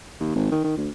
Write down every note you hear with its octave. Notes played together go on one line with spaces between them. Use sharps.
D#2
G#1
D#3
D#3
D2